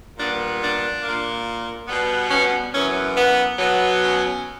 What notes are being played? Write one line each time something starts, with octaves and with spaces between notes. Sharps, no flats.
A#2 G3 B3 D4
D4
A#2 A#3
B2 G3 B3
C#4
F#2 E3 B3 C#4
B3
B2 F#3 B3
C#4